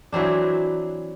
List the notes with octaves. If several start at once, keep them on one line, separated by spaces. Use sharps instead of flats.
E3 F#3 C4 D4